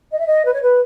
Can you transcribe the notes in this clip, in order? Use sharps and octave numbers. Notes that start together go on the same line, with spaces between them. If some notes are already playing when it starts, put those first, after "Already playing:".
D#5
E5
D#5
B4
C#5
B4